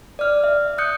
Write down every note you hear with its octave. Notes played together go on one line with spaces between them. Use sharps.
D5 F6
E5
D#6 F#6 G6 C#7